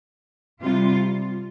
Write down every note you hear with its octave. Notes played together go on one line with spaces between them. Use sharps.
C3 G3 F4